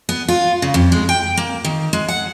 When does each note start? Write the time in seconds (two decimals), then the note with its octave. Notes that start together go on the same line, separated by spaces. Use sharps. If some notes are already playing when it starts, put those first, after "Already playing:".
0.09 B3
0.28 F4
0.62 C#3
0.74 F2
0.92 G#3
1.09 G5
1.37 A#3
1.65 D#3
1.93 G#3
2.08 F#5